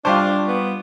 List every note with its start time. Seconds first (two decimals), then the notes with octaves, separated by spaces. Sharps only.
0.05 G3 D4 F4 G4 C5 A5 C#6 D6
0.47 B3